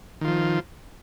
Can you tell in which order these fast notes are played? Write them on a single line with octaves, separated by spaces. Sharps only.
D#3 F4 F3